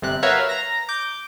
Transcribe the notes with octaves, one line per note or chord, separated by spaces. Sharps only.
G1 C3 F#6
F#4 A#4 B4 C#5 E5 F5
A#5 A#6
D6 G6